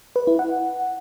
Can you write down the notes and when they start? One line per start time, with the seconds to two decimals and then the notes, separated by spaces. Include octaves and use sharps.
0.16 B4
0.27 E4
0.39 F#5